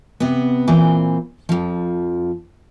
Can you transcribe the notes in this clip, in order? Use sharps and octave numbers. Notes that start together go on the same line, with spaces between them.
C3 B3
A#2 E3 C4 C5
F2 F3